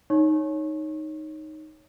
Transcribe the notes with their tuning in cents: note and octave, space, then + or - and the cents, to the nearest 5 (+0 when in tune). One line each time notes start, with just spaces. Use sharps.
D#4 +0 C#5 +0 C#6 -30